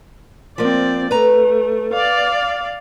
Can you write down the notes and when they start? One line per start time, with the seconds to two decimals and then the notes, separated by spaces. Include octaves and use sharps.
0.58 F3 A#3 C4 D5
1.11 A3 B4 A#5
1.93 D5 F5